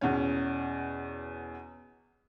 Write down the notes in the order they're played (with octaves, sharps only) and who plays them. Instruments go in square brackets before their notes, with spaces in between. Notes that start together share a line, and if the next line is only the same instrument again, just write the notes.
[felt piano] E2 B2 C#4